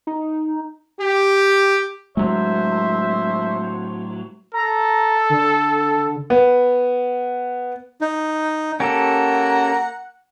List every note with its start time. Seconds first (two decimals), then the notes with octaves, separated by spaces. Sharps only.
0.07 D#4
0.99 G4
2.17 A2 F#3 G#3 C5 E5
4.54 A4 A#5
5.30 D3
6.30 B3
8.01 D#4
8.80 A#3 C#4 G4 A4 F#5 A#5